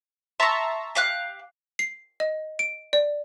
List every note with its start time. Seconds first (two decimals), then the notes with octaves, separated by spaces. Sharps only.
0.40 E5 A5 A#5 C6 C#6
0.95 G4 F5 F#6
1.79 C7
2.20 D#5
2.59 D7
2.93 D5